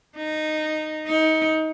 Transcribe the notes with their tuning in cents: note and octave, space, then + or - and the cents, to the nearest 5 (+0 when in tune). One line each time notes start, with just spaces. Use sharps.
D#4 -10
D#4 +25